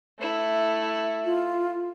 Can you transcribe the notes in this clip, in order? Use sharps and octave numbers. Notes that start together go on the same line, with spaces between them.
A3 E4
F4